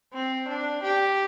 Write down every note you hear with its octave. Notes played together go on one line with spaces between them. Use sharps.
C4
D4
G4